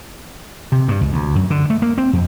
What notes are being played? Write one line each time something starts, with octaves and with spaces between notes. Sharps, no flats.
C3
G2
C#2
D2
F#2
D3
A3
A#3
C4
F2